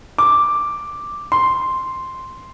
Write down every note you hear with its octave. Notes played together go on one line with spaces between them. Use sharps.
D6
C6